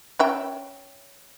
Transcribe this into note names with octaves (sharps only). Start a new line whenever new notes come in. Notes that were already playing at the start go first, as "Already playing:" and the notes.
C#4 E5 G5